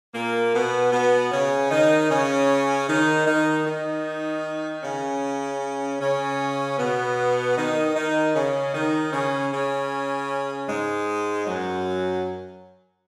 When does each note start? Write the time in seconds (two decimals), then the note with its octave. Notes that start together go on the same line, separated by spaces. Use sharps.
0.14 A#2 A#3
0.53 B2 B3
0.92 B2 B3
1.31 C#3 C#4
1.71 D#3 D#4
2.10 C#3 C#4
2.87 D#3 D#4
3.26 D#3 D#4
3.66 D#3 D#4
4.83 C#3 C#4
6.00 C#3 C#4
6.78 B2 B3
7.56 D#3 D#4
7.96 D#3 D#4
8.34 C#3 C#4
8.73 D#3 D#4
9.13 C#3 C#4
9.51 C#3 C#4
10.69 G#2 G#3
11.47 F#2 F#3